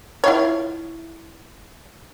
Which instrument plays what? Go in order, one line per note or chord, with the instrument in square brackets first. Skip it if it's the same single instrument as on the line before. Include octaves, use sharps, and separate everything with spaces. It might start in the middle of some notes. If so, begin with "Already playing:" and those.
[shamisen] E4 F4 C#5